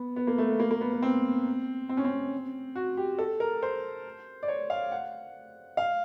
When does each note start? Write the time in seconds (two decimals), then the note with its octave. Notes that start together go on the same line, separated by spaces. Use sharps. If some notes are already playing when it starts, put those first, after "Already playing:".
Already playing: B3
0.16 B3
0.27 A#3
0.38 A3
0.49 B3
0.60 A#3
0.71 A#3
0.81 B3
0.92 B3
1.02 C4
1.89 C4
1.97 C#4
2.04 C4
2.76 F#4
2.97 G4
3.18 A4
3.40 A#4
3.63 C5
4.43 D5
4.48 C#5
4.70 F5
4.92 F#5
5.77 F5